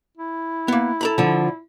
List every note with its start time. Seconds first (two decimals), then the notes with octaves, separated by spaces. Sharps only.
0.17 E4
0.68 A#3 B3
1.01 A4 A#5 B5
1.18 D3 F3